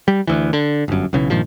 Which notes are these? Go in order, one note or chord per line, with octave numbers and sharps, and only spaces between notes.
G3
D2 E3
D3
G1 F#2
B1 C#3 E3
G2 A#2 D#3 F3